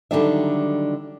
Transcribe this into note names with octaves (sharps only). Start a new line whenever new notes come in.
D3 D#3 F#3 G3 D4 E5